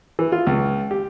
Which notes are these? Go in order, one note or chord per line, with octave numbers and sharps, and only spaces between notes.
E3
F4
C#2
G4